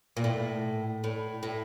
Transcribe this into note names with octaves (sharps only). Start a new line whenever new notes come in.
A#2
A2
A2
A2